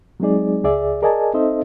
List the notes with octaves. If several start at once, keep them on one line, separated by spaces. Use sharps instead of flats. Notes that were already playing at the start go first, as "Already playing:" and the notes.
F#3 G#3 C4 D#4 G#4 D5
C#2 G#4 D5 E5
G#4 A#4 D5 D#5 G#5 A5
C4 D#4 A4 C5 D#5 E5